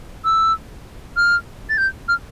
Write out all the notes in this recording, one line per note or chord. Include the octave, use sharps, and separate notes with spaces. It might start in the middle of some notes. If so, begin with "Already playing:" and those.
E6
F6
A6
G6
F6